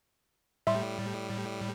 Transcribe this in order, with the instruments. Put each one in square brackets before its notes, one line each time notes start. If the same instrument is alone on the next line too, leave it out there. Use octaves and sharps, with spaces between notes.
[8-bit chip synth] A2 G3 [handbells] E5 C6